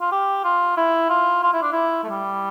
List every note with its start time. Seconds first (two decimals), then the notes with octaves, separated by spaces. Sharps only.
0.01 F4
0.12 G4
0.44 F4
0.77 E4
1.10 F4
1.43 F4
1.53 E4
1.62 D4
1.72 E4
2.04 A3
2.09 G3